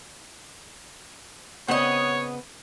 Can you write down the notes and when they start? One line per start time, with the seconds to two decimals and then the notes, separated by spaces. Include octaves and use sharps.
1.68 C#3 B3 C4 C#5 D#5 F#5